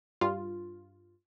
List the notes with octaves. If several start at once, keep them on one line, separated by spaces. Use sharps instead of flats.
G2 F4